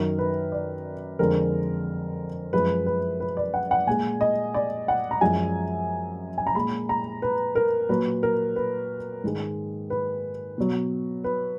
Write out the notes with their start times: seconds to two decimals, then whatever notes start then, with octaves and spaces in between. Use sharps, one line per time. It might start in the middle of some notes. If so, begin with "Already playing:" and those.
Already playing: F#2 D#3 F#3 A#4
0.19 B4
0.52 D5
1.19 F2 D3 F3 G#3 A#4
2.53 F#2 F3 G#3 B4
2.86 B4
3.20 B4
3.37 D5
3.54 F#5
3.71 F#5
3.87 A#2 G#3 G#5
4.21 D#5
4.54 D5
4.88 F#5
5.11 A#5
5.21 F#2 F3 G#3 G#5
6.38 G#5
6.47 A#5
6.55 A#2 G#3 B5
6.89 A#5
7.22 B4
7.55 A#4
7.89 A#2 F#3 B4
8.23 A#4
8.56 B4
9.24 G#2 D#3 G#3
9.90 B4
10.58 B2 F#3
11.24 B4